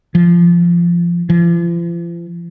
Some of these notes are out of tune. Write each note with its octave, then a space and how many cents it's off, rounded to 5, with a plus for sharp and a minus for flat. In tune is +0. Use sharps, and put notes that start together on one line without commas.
F3 -20
F3 -40